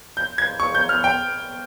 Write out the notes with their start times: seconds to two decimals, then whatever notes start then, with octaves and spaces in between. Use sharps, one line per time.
0.17 G6
0.38 G#6
0.60 C#6
0.75 G6
0.89 F6
1.04 G5